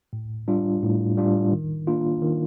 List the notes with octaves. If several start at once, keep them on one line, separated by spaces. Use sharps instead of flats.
A2
G3 D4 F4
A2
G3 D4 F4
D#3
A#3 D4 F4
D#3